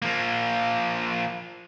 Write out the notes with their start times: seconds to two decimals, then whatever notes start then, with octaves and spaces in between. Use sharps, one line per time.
0.02 F3 A#3